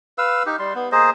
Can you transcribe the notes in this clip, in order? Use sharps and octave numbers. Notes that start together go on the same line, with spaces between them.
B4 F5 E6
D#4 G4
G3 C6
B3
A#3 G#4 C5 D#5